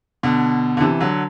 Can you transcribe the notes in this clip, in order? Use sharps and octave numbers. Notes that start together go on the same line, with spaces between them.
B2 D3
D3
C3 E3
D3 F#3